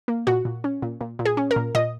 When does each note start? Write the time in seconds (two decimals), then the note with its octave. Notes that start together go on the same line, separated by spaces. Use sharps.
0.08 A#3
0.27 A#2 F#4
0.45 A#2
0.64 C#4
0.82 A#2
1.01 A#2
1.19 A#2
1.25 G#4
1.37 C#4
1.51 A#4
1.56 A#2
1.75 A#2 D#5